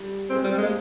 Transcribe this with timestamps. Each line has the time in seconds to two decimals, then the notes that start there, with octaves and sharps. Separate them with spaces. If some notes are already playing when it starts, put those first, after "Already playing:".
Already playing: G3
0.30 G#3 C4
0.44 G3 C4
0.57 G#3 A#3